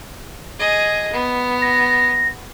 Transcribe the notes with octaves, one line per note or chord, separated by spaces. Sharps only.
G#4 D#5
B3
A#6